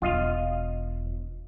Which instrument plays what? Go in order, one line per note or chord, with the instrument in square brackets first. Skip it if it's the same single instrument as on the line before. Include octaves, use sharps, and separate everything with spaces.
[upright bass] E1 [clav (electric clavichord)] F4 D#5 F5